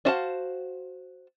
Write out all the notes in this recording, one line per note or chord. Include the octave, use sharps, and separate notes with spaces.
D4 F#4 C5 F5 A5